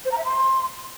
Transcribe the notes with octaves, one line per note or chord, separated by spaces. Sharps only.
C5
A#5
E5
C6